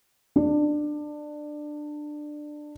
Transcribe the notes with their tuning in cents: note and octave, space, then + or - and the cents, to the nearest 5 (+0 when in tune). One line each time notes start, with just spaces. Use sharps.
D4 +20